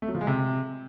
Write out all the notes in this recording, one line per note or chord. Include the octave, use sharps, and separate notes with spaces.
A3
F#3
F3
G#3
C3